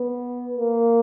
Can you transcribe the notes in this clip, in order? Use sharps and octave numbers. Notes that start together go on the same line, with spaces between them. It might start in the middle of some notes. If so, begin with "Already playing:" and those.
Already playing: B3
A#3